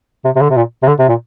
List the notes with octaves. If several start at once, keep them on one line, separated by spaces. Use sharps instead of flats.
C3
C3
D3
C3
A#2
C3
D3
C3
A#2